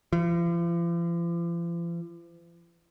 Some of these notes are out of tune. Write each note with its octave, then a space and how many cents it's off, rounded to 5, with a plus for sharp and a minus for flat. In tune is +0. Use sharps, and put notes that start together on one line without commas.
F3 -45